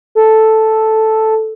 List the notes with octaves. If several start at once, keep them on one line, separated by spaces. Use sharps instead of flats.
A4